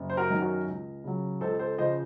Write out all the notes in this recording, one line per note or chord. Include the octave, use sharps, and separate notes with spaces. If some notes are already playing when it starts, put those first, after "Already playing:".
Already playing: F#1
C5
F#4 A#4
F#2 D#3 F#3
F#4 A#4
C#2
C#3 F#3
C#2 A4 C5
A4 C5
C#3 F3 C5 D#5